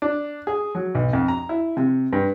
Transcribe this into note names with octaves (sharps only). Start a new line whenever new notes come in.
D4
G#4
F#3
B1
F2
A#5
E4
C3
G2